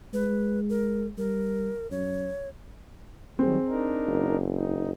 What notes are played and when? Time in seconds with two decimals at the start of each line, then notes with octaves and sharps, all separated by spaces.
0.14 G#3 B4
0.69 A#4
1.18 G3 A#4
1.91 F#2 C#5
3.39 D#3 F#3 G3 C4 G#4
3.68 D4 D#4 A#4
4.08 F#1
4.55 D#4